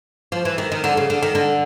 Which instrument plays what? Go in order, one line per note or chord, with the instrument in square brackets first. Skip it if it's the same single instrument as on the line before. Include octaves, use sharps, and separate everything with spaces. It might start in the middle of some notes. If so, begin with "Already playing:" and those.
[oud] F3
E3
D#3
D#3
D3
C#3
D3
D#3
D3